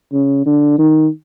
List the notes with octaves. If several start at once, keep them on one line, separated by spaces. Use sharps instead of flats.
C#3
D3
D#3